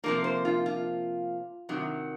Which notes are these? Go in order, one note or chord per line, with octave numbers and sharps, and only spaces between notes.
C3 F3 A#3 A#4
C5
F4
F4
C3 D#3 F#3